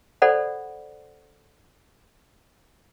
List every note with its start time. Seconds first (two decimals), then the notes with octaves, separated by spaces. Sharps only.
0.22 A4 C5 D5 F#5 B5